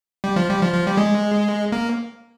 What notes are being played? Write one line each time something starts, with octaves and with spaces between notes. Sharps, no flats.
G3
F3
G3
F3
F3
G3
G#3
A#3